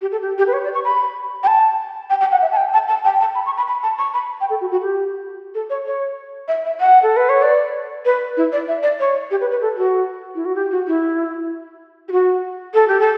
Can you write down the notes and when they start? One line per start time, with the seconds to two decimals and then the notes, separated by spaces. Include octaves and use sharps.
0.02 G4
0.12 A4
0.22 G4
0.38 G4
0.47 B4
0.53 C#5
0.64 D5
0.74 C#6
0.85 B5
1.43 G5
1.47 A5
2.10 G5
2.21 G5
2.32 F#5
2.42 E5
2.52 A5
2.57 G5
2.73 A5
2.88 A5
3.05 G5
3.21 A5
3.35 B5
3.46 C#6
3.57 B5
3.67 B5
3.83 A5
3.98 C#6
4.14 B5
4.41 G5
4.50 A4
4.61 F#4
4.72 F#4
4.82 G4
5.55 A4
5.70 C#5
5.86 C#5
6.48 E5
6.65 E5
6.80 F#5
7.03 A4
7.17 B4
7.29 C#5
7.42 D5
8.05 B4
8.37 E4
8.52 D5
8.68 E5
8.83 D5
9.00 C#5
9.31 G4
9.41 B4
9.51 B4
9.62 A4
9.77 F#4
10.35 E4
10.45 F#4
10.55 G4
10.71 F#4
10.87 E4
12.09 G4
12.12 F#4
12.74 A4
12.88 G4
13.00 A4